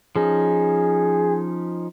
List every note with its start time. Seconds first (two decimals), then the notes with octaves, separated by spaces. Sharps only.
0.16 F3 C#4 D#4 G#4